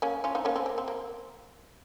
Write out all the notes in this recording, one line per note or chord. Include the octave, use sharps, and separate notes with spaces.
A#3 C#4
C#4 F4
C4 D#4
A#3 C#4
C4
A#3
C4
A#3